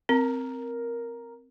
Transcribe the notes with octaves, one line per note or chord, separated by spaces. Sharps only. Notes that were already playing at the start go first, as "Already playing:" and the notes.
C4 A#4